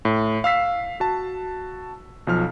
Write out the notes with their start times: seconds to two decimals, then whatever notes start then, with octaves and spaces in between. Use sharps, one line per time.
0.05 A2
0.44 F5 E6 B6 C7
1.00 F#4 A5
2.27 B1 F3 F6